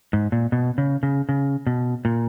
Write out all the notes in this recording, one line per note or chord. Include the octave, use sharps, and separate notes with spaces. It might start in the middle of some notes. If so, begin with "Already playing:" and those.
G#2
A#2
B2
C#3
C#3
C#3
B2
A#2